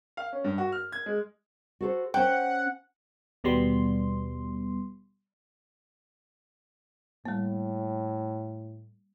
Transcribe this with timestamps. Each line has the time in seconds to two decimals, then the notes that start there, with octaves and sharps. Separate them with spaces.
0.17 F5
0.33 C#4
0.44 G2
0.58 F#4
0.72 F6
0.92 G#6
1.06 G#3
1.81 F#4 A4 C5
2.14 C#4 C5 F#5 G5 A5
3.44 D#2 B2 G3 B3 C6
7.26 A2 G3 A#3